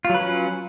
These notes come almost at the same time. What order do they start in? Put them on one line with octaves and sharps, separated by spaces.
F4 F#3 B4 C#4